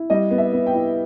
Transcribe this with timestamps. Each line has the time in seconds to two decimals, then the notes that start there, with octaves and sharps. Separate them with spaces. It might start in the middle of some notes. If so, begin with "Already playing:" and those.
Already playing: E4
0.10 G3 D#5
0.31 B3
0.38 E5
0.53 B3
0.66 G5
0.73 E4